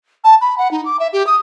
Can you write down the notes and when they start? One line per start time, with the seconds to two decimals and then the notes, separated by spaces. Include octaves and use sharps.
0.24 A5
0.41 B5
0.58 F#5
0.71 D#4
0.85 D6
1.00 E5
1.13 G4
1.27 D#6